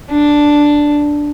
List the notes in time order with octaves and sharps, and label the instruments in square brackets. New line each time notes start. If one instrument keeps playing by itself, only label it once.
[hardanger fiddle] D4